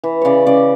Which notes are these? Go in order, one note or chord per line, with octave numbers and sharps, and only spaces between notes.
E3
C#3 C#5 D5
C#3 D5